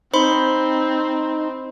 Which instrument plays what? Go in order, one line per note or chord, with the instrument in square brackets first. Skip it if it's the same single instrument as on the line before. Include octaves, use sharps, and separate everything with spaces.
[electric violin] C4 [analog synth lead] D#4 [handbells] C5 B5 C6